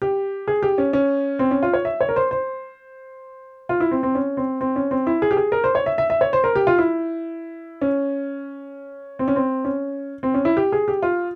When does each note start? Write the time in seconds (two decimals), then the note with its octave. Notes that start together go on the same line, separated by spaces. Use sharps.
0.02 G4
0.48 G#4
0.63 G4
0.78 C#4
0.93 C#4
1.39 C4
1.51 C#4
1.63 F4
1.73 C#5
1.85 E5
2.01 C#5
2.09 A#4
2.16 C5
2.31 C5
3.69 F4
3.80 E4
3.91 C4
4.03 C4
4.15 C#4
4.37 C4
4.61 C4
4.76 C#4
4.91 C4
5.07 E4
5.22 G#4
5.31 G4
5.37 G#4
5.52 A#4
5.64 C5
5.75 C#5
5.86 E5
5.98 E5
6.10 E5
6.21 C#5
6.33 C5
6.44 A#4
6.55 G4
6.67 F4
6.78 E4
7.82 C#4
9.19 C4
9.28 C#4
9.36 C4
9.65 C#4
10.23 C4
10.34 C#4
10.45 E4
10.57 G4
10.72 G#4
10.88 G4
11.03 F4